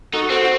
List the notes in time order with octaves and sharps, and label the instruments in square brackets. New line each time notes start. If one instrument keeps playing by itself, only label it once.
[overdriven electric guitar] D#4 [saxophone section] F#4 A4
[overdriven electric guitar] C4 [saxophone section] F#4 A4
[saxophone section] F#4